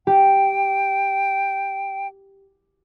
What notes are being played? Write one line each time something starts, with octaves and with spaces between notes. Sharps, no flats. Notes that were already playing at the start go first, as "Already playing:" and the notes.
G4 G5